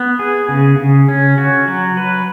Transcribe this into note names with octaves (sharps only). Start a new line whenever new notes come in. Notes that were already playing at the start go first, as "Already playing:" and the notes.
Already playing: B3
G#4
C#3
C#3
C#4
F#4
F#3
B4